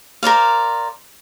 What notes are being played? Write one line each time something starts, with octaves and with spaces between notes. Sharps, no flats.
A#4 C5 D5 F5